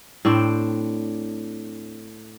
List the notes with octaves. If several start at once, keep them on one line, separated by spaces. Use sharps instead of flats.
A2 C4 D4 G5